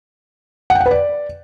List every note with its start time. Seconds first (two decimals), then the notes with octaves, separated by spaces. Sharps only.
0.70 F#5
0.75 G5
0.80 F#5
0.86 B4
0.91 D5